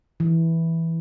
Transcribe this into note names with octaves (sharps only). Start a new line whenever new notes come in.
E3